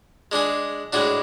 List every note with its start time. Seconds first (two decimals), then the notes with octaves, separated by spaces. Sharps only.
0.32 G#3 D4 G#4
0.93 A2 G#3 D4 F#4